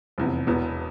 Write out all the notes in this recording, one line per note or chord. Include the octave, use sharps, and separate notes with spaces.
F1 E2 C3
E1 E2 B2 B3